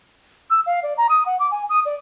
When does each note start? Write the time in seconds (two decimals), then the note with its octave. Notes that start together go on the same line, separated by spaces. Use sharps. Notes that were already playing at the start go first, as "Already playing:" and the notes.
0.50 E6
0.66 F5
0.83 D5
0.98 A#5
1.09 D#6
1.26 F#5
1.39 D6
1.51 G#5
1.69 D#6
1.85 D5